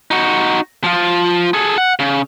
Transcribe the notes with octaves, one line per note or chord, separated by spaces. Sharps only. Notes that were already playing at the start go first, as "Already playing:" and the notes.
D#4 F#4
F3 F4
G#4 A4
F#5
C#3